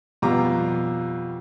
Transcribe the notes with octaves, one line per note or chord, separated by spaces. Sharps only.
F2 B2 G3 F4 A#5 D6